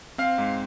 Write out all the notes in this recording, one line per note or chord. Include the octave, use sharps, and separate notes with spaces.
C4 F5
G#2